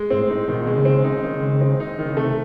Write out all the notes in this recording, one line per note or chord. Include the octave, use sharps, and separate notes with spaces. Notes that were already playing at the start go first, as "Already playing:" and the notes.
Already playing: G#3
G#2 C4
A2
D#4
B2 D#3
A#2
B2 G#3
C#3
C4
D#4
D#3
G#3
C4
D#4
D#3
C#3
C3 A3